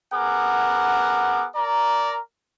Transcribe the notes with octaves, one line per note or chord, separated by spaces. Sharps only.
B3 G#4 A#4 F#5 D6
A#4 D5 A#5